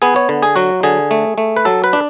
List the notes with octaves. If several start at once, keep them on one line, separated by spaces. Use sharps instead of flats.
B3 G#4
C#5
D3
G#4
F#3 F#4
D3 G#4
A3
A3
B4
F#3 A4
B4
D4